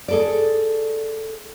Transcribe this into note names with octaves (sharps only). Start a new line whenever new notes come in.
G#4 A4 D5